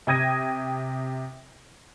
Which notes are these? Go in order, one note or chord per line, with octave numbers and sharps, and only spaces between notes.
C3 G5 D#6 G#6 A#6 D#7